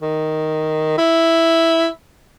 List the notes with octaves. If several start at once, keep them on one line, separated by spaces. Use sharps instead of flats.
D#3
E4